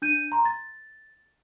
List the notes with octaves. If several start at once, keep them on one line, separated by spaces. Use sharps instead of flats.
D4 G6 D#7
A#5 C6
A6